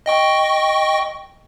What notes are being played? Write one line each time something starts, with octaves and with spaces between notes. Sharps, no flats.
D#5 G5 C#6